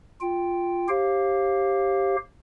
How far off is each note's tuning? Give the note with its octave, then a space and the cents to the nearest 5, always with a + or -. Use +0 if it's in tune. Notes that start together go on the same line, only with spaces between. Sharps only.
F4 +0 G5 +0
G4 +0 C5 +40 F5 +0